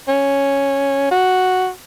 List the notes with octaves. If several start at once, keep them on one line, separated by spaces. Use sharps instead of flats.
C#4
F#4